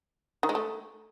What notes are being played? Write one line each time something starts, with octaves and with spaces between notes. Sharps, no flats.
D#3
G#3
A3